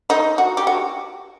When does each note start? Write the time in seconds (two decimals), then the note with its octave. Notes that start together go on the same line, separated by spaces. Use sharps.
0.10 D#4
0.38 F#4
0.57 G4
0.67 F#4